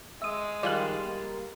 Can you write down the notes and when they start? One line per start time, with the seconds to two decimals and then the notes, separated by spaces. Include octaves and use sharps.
0.22 G#3 E5 D#6
0.63 D#3 F3 G3 F4 G#4 D5 F#6
1.04 A#3